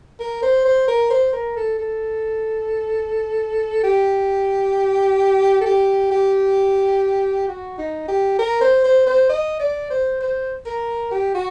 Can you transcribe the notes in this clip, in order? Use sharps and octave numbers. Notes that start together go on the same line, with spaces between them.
A#4
C5
C5
A#4
C5
A#4
A4
A4
G4
A4
G4
G4
F#4
D#4
G4
A#4
C5
C5
C5
D#5
D5
C5
C5
A#4
G4
F#4